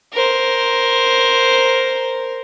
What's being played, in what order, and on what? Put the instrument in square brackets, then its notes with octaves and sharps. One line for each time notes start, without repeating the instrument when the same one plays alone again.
[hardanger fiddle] A#4 C5